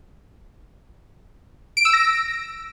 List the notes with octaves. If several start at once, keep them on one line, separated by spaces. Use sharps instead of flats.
D7
E6
A#6